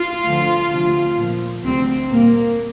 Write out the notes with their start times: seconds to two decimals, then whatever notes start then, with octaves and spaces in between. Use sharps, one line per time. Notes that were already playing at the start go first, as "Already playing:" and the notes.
Already playing: F4
0.24 D2 D3 F3
0.71 D2 C3 F3
1.17 A#2 F3
1.63 D2 C3 G3 C4
2.10 A#2 G3 A#3